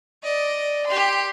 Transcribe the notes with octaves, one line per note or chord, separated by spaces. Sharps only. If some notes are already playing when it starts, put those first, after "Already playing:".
D5 D#5
G4 C6